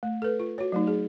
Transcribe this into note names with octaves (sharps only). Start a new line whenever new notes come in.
A3
A4 B4
F4
F#4 C#5
F#3 A3 D#4
G#4